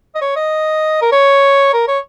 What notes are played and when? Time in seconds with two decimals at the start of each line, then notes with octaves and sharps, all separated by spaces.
0.15 D#5
0.21 C#5
0.36 D#5
1.02 A#4
1.12 C#5
1.73 A#4
1.88 C#5